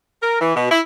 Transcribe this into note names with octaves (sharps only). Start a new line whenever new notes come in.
A#4
E3
B2
E4